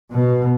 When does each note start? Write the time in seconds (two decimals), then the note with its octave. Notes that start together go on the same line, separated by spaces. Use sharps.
0.11 B2